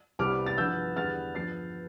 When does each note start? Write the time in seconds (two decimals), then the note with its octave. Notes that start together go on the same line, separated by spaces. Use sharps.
0.19 C2 C3 G3 B3 D6 F6
0.46 A6
0.58 G2 F3 B3 E6 G6
0.96 E2 D3 G3 B3 F6 A6
1.35 G2 F3 B3 A6 C7